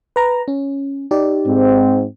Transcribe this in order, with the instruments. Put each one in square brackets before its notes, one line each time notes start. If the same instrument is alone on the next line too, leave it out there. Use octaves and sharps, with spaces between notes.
[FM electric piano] B4 A#5
C#4
D#4 G4 D5
[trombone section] G#2 C4